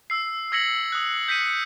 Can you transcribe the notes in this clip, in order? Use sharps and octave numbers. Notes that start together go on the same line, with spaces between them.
E6 C7
E6 G#6 A#6 B6 C#7 F#7
D#6 F#6
G6 B6 C#7 D#7